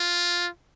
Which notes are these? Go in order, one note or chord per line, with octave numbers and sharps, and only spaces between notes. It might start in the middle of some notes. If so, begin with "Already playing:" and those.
Already playing: F4